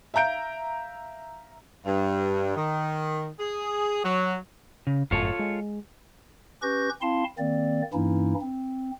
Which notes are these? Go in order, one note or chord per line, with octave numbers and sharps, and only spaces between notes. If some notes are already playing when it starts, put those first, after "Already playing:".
E5 F5 A#5 G6 D7
G2
D#3
G#4
F#3
C#3
G1 F#2 A2 F4 A4 C#5
G#3
C#4 G4 B4 C#6 G6 A#6
C4 E4 F5 A5 C6
D#3 A#3 C4 D5
G2 E3 A#3 C#4 D#4 E4
C4